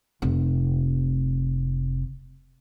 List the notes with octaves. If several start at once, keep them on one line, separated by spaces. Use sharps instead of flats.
F1 C3